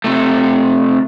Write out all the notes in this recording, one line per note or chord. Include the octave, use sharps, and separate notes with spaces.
C3 A3